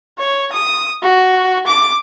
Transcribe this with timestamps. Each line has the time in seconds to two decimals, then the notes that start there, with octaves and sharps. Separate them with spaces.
0.18 C#5
0.52 D#6
1.02 F#4
1.67 D6